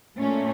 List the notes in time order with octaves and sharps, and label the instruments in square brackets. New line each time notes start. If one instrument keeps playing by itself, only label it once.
[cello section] A#2 A3 C#4